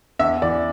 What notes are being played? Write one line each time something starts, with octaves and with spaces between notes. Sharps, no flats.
E2 E5
E3 D5